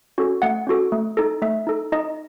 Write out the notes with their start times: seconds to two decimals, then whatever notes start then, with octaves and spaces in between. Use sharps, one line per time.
0.18 C#4 F#4 A4
0.42 A3 F#5
0.67 C#4 F#4 A4
0.92 A3
1.17 D#4 A4
1.42 A3 E5
1.67 D#4 A4
1.92 D#4 D#5